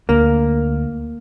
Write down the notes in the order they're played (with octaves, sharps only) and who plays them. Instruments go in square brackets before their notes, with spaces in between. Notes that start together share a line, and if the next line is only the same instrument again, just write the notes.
[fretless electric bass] D2 [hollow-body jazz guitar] A#3